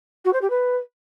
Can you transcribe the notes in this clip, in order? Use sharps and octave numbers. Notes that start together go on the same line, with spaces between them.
F#4
C5
G4
B4